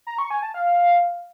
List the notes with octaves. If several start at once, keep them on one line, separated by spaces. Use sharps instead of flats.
A#5
C#6
G#5
A5
F5